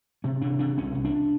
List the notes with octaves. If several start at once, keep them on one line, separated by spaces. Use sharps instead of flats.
C3 C#4
C3 D4
C3 D4
C2 C#4
C2
D4